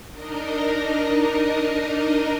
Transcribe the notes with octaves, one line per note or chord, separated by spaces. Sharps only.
D4 D#4 A#4 D#5